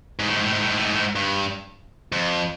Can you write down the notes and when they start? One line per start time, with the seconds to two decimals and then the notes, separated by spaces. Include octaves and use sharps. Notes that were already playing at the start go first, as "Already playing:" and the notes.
0.19 G#2
0.28 A2
0.35 G#2
0.43 A2
0.52 G#2
0.60 A2
0.68 G#2
0.76 A2
0.84 G#2
0.92 A2
1.00 G#2
1.16 G2
2.12 F2